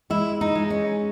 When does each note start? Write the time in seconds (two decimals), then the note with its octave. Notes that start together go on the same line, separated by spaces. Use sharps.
0.10 G#3 E4
0.41 D#4
0.55 G#3
0.70 C#4